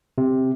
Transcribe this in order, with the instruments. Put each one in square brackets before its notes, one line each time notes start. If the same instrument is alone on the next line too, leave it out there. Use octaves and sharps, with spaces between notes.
[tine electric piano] C3